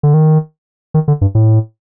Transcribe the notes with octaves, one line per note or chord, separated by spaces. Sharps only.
D3
D#3
D#3
D3
G2
A2